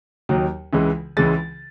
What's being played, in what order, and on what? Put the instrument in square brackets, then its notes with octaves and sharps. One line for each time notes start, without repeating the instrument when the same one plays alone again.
[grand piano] D#2 D#3 F#3
C#2 C#3 E3 G#3
C#2 C#3 E3 G#3 A6